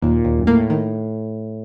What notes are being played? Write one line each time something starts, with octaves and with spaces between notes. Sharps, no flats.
D#2 A#2
D#2
F#2
A2 A#3
D#3